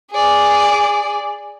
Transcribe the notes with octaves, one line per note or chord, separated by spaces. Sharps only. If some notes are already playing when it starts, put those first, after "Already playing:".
G#4 D5